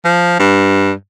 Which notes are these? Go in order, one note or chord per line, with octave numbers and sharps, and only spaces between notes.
F3
G2